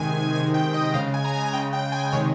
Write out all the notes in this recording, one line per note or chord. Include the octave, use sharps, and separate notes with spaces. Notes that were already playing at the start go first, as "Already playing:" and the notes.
Already playing: C3 D#3 G#3 G#5
C3 D#3 G#3 G#5
G5
D#5
C#3 G#3 F5
G#5
A#5
G#5
C#3 G#3 G5
G5
G#5
C3 D#3 G#3 C#5